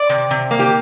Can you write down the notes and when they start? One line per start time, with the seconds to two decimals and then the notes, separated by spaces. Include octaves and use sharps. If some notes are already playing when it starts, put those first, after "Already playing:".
Already playing: D5
0.09 C3
0.31 C3
0.51 A#3
0.59 G4